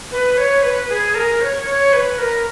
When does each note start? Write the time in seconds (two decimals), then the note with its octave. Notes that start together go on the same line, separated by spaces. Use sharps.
0.11 B4
0.37 C#5
0.63 B4
0.89 G#4
1.15 A#4
1.41 C#5
1.66 C#5
1.93 B4
2.18 A#4